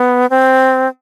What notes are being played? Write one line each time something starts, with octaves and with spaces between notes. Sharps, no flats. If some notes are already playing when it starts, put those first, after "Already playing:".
Already playing: B3
C4